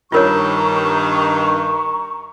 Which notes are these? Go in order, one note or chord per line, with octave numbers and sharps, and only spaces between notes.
G2 D#3 F4 A#4 C#5 A#5 C#6